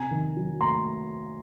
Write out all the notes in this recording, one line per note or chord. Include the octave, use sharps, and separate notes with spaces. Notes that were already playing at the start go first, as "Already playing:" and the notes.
Already playing: C3 G#5 A#5
D#3
F#3
A3 A#5 C6